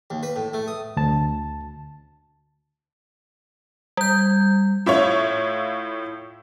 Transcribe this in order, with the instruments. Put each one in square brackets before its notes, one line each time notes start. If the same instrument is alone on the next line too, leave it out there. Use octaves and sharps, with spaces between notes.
[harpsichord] D#2
B4
A2
A3
D#6
[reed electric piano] D2 A5
[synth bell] G3 G6
[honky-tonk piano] A2 E4 F4 C#5